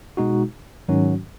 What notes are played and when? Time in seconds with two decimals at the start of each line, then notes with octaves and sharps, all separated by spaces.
0.17 B2 G#3 D#4 F#4
0.88 G#2 D#3 F#3 C#4 F#4